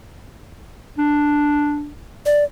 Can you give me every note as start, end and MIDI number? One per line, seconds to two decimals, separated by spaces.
0.98 1.90 62
2.26 2.44 74